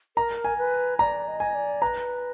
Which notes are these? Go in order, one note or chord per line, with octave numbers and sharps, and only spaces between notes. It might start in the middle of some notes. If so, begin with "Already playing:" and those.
A#4 A#5
G#5
B4
D5 A#5
D#5
G#5
D5
B4 A#5